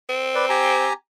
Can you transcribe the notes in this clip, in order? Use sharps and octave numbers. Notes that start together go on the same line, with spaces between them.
C4
B4 D5
G4 G#5 A#5